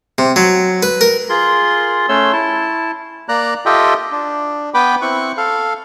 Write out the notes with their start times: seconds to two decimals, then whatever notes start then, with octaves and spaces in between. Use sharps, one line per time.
0.18 C3
0.36 F#3
0.83 B4
1.01 A#4
1.29 F4 G#4 A#4 C6
2.09 A3 C#4 C#5 C6 E6
2.33 E4 A5
3.29 A#3 D5 A#5 F#6
3.66 F4 G4 A4 D#5 E5 G5
4.12 D4
4.74 B3 B4 G5 B5 D6
5.02 C4 E4 C#6 F#6
5.37 A4 F5